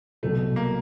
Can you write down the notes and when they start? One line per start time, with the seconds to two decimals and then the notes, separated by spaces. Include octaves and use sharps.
0.23 C2 B2 F#3 A3
0.56 A#3